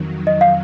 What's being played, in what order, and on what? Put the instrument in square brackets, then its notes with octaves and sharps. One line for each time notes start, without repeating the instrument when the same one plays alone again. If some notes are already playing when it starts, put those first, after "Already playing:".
Already playing: [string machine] F2 D#3 F#3
[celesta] D#5
F5